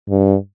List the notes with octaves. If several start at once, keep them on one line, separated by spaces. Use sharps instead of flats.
G2